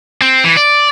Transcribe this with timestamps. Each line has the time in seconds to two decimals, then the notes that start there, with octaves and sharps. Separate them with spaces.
0.21 C4
0.44 E3
0.57 D5